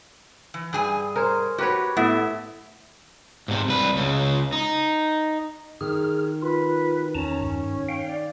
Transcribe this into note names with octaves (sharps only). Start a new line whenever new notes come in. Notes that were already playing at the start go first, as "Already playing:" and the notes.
E3
G2 G#4 G#5
A#4 C5 C#5
F#4 G4 B4 C#5
A2 B3 E5
G#2 C3
C2 B4
C#2 C#3
D#4
D#3 G#4 F6
F4 B4
E2 C#4 A5 A#5
G2
F5 G5
D5